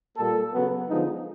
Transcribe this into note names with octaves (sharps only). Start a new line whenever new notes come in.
A#2 G3 A#3 A4
C#3 F#3 B3
D3 F3 G#3 B3 D#4